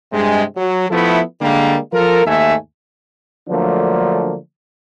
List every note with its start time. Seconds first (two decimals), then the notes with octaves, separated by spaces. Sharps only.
0.12 G2 C3 G#3
0.56 F#3
0.90 F3 A3 B3 E4 A4
1.41 D3 G3 G#3 A#3
1.92 F3 F4 A4 A#4
2.25 D#2 G#2 A3 E5 G#5
3.48 D3 F3 F#3 A3 A#3 D4